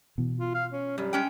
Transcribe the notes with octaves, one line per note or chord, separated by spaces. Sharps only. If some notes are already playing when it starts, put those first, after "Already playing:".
B2 E3
F4
F5
C#4
F#2 G3
G#3 C#4 G5